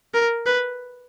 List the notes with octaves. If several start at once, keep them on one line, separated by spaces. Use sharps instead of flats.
A#4
B4